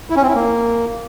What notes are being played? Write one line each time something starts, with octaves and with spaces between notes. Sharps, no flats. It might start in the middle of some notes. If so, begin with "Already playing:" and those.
E4
C#4
C4
E4
A#3